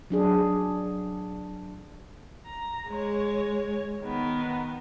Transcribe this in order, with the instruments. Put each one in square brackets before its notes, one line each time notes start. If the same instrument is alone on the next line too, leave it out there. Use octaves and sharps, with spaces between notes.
[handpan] F#3 D4 G#4
[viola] A#5
G#3 C#5
D#3 B3